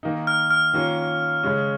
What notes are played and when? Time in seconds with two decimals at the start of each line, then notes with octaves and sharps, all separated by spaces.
0.03 D#3 A#3 D#4
0.27 F6
0.50 F6
0.74 D#3 A#3 C#4 F4
1.43 C#3 G#3 C#4